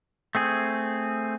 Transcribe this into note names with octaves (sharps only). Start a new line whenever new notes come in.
A3 C4 G#4